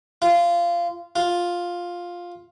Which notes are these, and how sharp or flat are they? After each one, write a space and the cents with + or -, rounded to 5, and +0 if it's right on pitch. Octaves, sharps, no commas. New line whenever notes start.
F4 -20
F4 +5